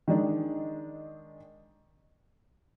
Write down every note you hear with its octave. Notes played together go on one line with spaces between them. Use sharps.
D#3 G#3 D4